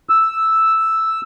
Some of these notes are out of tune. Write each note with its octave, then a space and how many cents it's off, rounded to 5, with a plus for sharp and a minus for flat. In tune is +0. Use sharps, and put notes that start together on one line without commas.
E6 -5